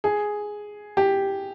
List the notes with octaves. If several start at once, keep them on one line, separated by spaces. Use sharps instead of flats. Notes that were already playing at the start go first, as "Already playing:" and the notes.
G#4
G4